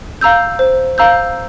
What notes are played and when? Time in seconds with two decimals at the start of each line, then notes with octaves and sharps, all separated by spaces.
0.21 F5 A#5 E6 G6
0.59 C5
0.98 F5 A#5 E6 G6